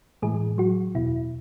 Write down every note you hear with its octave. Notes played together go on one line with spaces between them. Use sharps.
A2 E3 G#3 G#4
F#3 F#4
E2 B2 E4